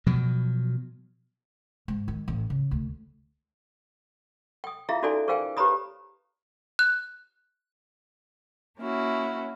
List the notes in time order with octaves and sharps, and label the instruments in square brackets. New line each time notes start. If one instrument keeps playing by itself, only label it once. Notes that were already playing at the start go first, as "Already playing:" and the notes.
[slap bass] B2 F3 F#3
[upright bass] G#2
D#3
A1
C#3
D2
[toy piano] G5 D#6
E4 F4 G#4 E5 F5 A#5
C#4 D#4 F#4 A4 D5 G#5
G#4 A#4 C5 F5 G5 G#5
G4 B4 C#5 A#5 B5 D#6
[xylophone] F#6
[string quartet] A#3 C#4 E4 F#4